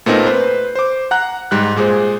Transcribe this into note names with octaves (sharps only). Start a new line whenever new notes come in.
A#2 A3 B3 C4 D#4 A#4
B4 C5
C5 D6
F#5 A#5 F#6
G#2 G3 F#6
A#2 G#3 G#4 C5